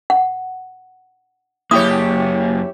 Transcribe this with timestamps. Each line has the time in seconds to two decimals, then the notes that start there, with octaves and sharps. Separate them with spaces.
0.10 F#5
1.71 F#2 A#3 E4 G4 C#5 D#6